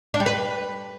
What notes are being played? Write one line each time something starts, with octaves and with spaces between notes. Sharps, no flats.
D4
G3
B4